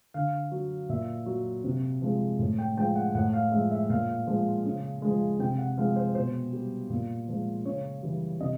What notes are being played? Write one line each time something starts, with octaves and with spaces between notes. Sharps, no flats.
D3 F5
F#3
A#2 E5
F#3
C3
F3 G#3
A2
G5
F3 G#3 G5
F#5
A2 F#5
F5
F3 G#3 E5
E5
A#2 F5
F3 G#3
C#3
F3 G#3
C3 G5
F#5
F3 G#3 F5
C5
B2 C5
G3
A#2
F3 G#3
C#3 C#5
E3 G3
C3 D#5